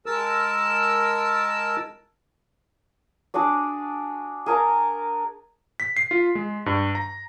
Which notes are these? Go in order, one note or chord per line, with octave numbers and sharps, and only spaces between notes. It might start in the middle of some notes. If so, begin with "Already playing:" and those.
G#3 A#4 A5 E6
D4 F#4 G#4 D5
G#4 A#4 A5 A#5
B6
C7
F4
G#3
G2
A#5